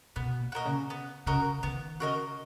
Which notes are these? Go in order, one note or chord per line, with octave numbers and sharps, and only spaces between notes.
B2 B3
A#2
F#4 A#4 D#5
C#3
B3
C#3 F#4 A#4 D#5
D#3 B3
C#3 F#4 A#4 D#5